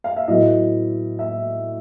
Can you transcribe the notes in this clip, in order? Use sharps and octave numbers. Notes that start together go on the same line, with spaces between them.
F5
E5
A2 F#3 B3 D#5
E5